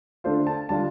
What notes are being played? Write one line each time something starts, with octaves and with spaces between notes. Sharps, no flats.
D3 A3 D4 F4 C5
A5
D3 G3 D4 F4 A5